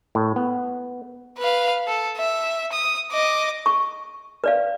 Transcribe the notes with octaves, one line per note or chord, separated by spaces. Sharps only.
A2
B3
B4 F5
A4
E5
D#6
D#5 D6
C#6
B4 D5 F5